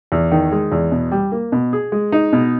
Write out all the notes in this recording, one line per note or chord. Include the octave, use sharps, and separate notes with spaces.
E2
D#3
G#3
E2
B2
G3
A#3
B2
G#4
G#3
D#4
B2